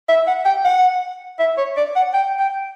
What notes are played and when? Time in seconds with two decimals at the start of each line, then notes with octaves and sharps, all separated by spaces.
0.09 E5
0.27 F#5
0.45 G5
0.65 F#5
1.39 E5
1.58 C#5
1.77 D5
1.96 F#5
2.14 G5
2.39 G5